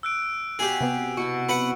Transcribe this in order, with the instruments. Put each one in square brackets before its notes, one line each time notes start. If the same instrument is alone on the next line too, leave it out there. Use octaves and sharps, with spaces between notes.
[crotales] E6 F#6 D7
[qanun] B2 D5 E5 [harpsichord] G4 G#4
[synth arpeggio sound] C3 B3
[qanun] B2 E4 G#5 [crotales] C#6 C#7
[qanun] F#3 [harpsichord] B4 F#5